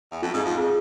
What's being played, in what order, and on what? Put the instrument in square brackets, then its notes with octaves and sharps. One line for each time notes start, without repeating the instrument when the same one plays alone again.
[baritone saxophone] E2
[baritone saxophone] F2 [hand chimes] F4
[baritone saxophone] G#2
F2
[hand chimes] G#4